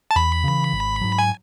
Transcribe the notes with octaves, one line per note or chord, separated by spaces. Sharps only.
A5
E2 B5
C#3 E3
G#1
G#2 F#3
G#5